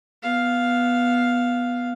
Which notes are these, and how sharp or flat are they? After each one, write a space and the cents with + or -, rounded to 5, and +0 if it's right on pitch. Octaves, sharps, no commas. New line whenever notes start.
B3 +0 F5 +0